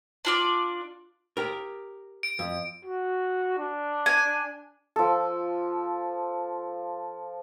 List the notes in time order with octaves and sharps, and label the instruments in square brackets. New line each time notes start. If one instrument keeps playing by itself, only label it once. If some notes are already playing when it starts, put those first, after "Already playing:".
[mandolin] D4 F4 D5
[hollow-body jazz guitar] G4 A#4
[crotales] D7
[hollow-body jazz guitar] F2
[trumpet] F#4
D4
[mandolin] G#5
[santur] F3 A4